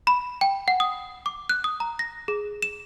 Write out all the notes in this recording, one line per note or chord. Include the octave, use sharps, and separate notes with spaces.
B5
G5
F#5
D#6
D6
F#6
D#6
A#5
A#6
G#4
E7